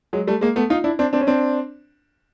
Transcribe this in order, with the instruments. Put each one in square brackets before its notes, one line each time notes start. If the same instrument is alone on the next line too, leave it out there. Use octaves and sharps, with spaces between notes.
[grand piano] F#3 G#3
G3 A3
G#3 A#3
A3 B3
D#4 F4
D4 E4
C4 D4
C4 D4
C#4
C4 D4